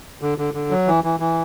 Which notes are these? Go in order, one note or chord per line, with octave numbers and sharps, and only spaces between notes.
D3
D3
D3
F#3
E3
E3
E3